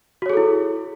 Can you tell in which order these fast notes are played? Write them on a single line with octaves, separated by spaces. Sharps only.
F#4 C#5 G#4 A4 E4